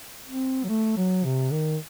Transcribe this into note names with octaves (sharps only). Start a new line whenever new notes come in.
C4
F#3
A3
F#3
C3
D#3